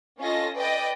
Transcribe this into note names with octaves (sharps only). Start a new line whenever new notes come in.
C#4 F4 A4 D#5 A#6
B4 D5 D#5 G5